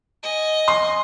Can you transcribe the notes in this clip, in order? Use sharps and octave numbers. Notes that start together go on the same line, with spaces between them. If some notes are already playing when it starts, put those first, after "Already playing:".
D#5 G#5
C6